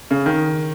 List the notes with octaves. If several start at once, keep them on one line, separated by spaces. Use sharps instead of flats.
C#3
D#3